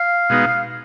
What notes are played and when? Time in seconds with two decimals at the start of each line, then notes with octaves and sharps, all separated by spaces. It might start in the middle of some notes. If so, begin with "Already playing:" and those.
Already playing: F5
0.29 B2 G#3 B3 D#4